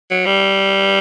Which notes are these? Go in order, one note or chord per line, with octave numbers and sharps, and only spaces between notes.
F#3
G3